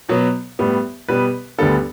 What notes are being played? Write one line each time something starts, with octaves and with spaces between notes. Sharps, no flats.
B2 F#3 B3
A2 G3 B3
B2 G3 B3 B4
D2 D3 G3 B3 A4